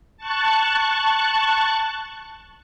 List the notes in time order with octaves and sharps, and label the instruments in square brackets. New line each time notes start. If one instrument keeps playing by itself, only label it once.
[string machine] A5 C#6 F#6